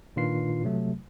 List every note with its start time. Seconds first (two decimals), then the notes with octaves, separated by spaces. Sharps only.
0.16 A#2 D#3 D4 F4 B4 C7
0.64 C3 F#3 A3